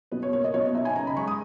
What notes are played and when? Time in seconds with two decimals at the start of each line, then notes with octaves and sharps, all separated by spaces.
0.12 B2 B4
0.23 C#5
0.33 A#3 C#5
0.44 D#5
0.54 B2 C#5
0.65 D#5
0.75 D#4 E5
0.85 G#5
0.96 C#3 A#5
1.07 B5
1.17 G#3 C#6
1.27 D#6